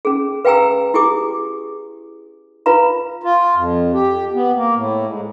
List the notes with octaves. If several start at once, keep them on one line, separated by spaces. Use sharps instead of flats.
C#4 G#4
B4 F5 G5 G#5 A#5 E6
E4 G4 G#4 G#5 D6 D#6
F4 B4 F5 A#5
F4
F2
G4
B3
A#3
A2
G#2